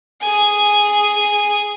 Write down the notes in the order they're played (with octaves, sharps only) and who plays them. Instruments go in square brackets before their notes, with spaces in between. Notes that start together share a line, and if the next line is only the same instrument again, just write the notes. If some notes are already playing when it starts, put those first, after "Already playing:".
[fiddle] G#4 G#5